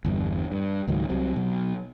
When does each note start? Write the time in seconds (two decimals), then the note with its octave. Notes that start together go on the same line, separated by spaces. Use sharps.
0.05 G1 E2 G2
0.52 G2
0.88 C#2 G#2 D#3 F#3
1.09 C2 C3 F#3 C4
1.36 B2 F#3